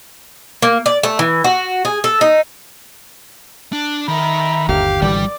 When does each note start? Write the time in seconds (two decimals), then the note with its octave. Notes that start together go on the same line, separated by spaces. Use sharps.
0.62 A#3
0.86 D5
1.03 A3
1.19 E3
1.44 F#4
1.85 G#4
2.04 A4
2.21 D#4
3.73 D4
4.08 D#3 E5 A#5 B5
4.69 G1 D#2 D3 G4 F5
5.02 G#1 D3 E3 G3 D5 D6